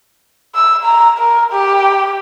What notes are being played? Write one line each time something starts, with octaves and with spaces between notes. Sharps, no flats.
E6
A#5
A#4
G4